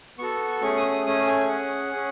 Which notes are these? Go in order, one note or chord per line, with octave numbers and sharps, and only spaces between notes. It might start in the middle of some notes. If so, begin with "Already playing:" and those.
B3 F#4 A4 C#6
A3 C#4 G#4 C#6
D#6
D#6
A3 C#4 G#4 D#6
G#5
C#4 G#4 F#5
C#4 G#4